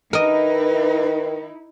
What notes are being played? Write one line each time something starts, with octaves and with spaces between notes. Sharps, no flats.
D#3 D#4 E4 A#4 B4 D#5